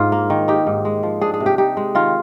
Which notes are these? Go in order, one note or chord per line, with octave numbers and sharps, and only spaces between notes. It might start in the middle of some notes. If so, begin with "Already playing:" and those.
Already playing: G#2 F4
A#3
D#3
D#4 G4
G#2
G#3
F3
D4 G#4
G#4
C3
G4
D#4 G4
G#3
D#3 F4